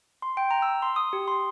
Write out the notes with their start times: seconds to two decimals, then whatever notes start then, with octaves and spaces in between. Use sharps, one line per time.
0.22 C6
0.37 G5
0.51 A#5
0.62 E6
0.82 C6
0.96 D#6
1.13 G4
1.28 C6